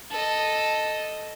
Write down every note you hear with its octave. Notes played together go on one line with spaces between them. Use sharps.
A4 D#5